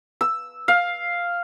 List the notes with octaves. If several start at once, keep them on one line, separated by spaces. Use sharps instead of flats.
E6
F5